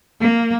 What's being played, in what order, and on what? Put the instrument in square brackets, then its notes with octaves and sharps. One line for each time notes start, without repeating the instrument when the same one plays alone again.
[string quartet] A#3